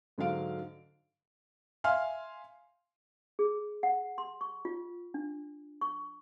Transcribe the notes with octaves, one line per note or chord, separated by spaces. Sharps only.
G#2 D3 F#3 F5 D7
E5 F5 G#5 C6 F6
G#4
F#5
C6
C#6
F4
D4
C#6